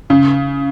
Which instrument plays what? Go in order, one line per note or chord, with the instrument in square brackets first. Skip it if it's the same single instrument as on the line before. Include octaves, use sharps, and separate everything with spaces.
[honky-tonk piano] C#3